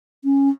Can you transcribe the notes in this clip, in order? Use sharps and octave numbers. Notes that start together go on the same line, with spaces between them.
C#4